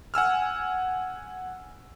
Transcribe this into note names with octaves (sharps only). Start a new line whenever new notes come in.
F#5 G#5 E6 F6